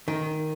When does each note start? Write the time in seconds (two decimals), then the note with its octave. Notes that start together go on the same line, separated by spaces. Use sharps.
0.08 D#3